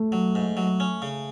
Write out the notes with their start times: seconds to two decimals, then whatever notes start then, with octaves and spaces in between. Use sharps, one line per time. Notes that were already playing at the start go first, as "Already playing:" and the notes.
Already playing: A3
0.12 F#3
0.35 G#2
0.57 F#3
0.80 C#4
1.02 C#3